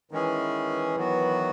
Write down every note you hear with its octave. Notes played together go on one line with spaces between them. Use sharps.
D#3 E3 G#3 C#4 G#4
D#3 F#3 B3 F#4